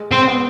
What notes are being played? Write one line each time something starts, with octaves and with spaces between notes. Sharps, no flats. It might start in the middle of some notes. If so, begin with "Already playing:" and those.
Already playing: G#3
C4
B3